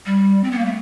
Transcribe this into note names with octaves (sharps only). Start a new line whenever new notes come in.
G3
C4
B3
A#3
A3